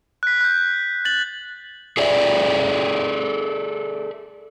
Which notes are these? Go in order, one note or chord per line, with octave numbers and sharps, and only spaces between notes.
F#6 B6
F#6 G6
A6 F#7
G#4 A4 D5 E5